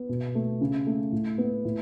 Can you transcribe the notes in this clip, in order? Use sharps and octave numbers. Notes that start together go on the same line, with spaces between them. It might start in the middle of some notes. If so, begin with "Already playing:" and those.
Already playing: B3
B2
A3
C#3
A3
A2
B3
A2